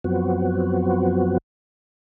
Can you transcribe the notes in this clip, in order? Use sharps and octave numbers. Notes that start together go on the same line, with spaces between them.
F#2 F3 F#3 B3 C4 F#4